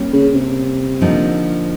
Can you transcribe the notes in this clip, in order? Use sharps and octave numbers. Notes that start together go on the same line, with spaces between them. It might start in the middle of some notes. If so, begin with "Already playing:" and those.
Already playing: G3 A#3 C#4
C#3
C3
D3 F3 A#3 D#4